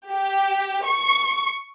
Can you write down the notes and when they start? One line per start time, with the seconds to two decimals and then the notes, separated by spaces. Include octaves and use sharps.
0.11 G4
0.87 C#6